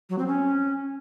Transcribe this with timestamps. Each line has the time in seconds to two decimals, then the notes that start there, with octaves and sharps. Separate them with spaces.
0.10 F#3
0.19 C4
0.28 C#4